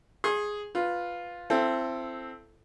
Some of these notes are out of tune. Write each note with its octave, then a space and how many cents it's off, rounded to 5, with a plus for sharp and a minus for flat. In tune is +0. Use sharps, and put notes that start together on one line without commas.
G#4 +0 C6 +40
F4 +5 B4 +0
C4 +0 E4 +35 A4 +0